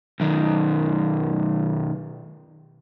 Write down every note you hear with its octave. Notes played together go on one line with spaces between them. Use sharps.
B1 D#3